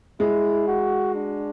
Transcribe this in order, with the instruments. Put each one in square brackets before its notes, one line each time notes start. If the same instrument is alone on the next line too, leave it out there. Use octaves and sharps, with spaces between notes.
[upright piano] G#3 [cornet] E4
[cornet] F#4
D4